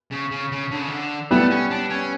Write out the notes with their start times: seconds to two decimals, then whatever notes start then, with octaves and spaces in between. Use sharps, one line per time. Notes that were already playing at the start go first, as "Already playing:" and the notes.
0.11 C#3
0.31 C#3
0.52 C#3
0.71 D3
0.80 C#3
0.88 D3
1.31 G3 A3 B3 E4 G4
1.51 C#4
1.71 D4
1.90 C#4